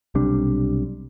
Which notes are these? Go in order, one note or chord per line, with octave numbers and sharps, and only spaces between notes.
B1 C3 G3 D4